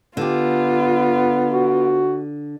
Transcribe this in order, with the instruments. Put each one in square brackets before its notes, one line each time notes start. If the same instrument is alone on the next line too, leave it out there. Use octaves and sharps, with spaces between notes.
[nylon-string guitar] D3 G4 [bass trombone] B3 [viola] F4
[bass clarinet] F#4